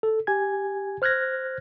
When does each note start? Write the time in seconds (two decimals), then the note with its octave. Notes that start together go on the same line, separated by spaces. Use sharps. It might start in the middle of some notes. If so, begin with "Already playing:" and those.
0.03 A4
0.27 G4 G#5 G#6
1.02 C5 F6 F#6 G#6 A#6